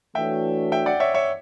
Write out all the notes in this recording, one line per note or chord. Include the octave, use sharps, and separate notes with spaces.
E3 A3 D4 F#4 C#5 E5 G5
E5 G5
D5 F#5
C#5 E5
C#5 E5